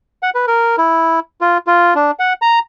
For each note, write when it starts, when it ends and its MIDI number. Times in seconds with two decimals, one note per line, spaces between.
0.23 0.30 78
0.35 0.46 71
0.48 0.76 70
0.78 1.20 64
1.41 1.58 65
1.67 1.94 65
1.95 2.11 62
2.19 2.33 78
2.42 2.59 82